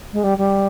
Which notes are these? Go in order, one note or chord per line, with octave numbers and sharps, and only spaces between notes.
G#3
G3
G3